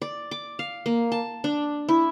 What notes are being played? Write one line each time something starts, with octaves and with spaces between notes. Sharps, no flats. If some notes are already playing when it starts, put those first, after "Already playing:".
D5
D6
F5
A#3
A5
D4
E4